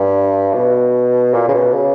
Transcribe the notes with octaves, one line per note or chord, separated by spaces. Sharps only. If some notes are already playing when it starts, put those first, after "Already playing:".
Already playing: G2
B2
A#2
C#3
B2
C#3